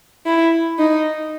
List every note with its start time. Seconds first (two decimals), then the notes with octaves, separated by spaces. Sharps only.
0.26 E4
0.79 D#4